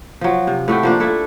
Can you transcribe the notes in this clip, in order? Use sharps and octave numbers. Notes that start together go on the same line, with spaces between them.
F3 F#3
C3
A2 A3 F#4 G5
F3 A#3 D4
A3 E4 A4